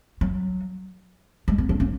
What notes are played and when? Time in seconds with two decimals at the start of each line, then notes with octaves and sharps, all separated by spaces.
0.21 F#3
1.48 G#3
1.58 B3
1.69 D4
1.80 C#4